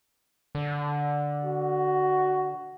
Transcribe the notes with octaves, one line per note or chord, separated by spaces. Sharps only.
D3
F#4